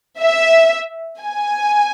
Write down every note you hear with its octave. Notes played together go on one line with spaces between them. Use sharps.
E5
G#5